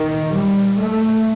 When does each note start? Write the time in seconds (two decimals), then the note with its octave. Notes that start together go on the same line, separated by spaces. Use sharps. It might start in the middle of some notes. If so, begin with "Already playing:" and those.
Already playing: A#2 D#3
0.33 G3
0.78 A3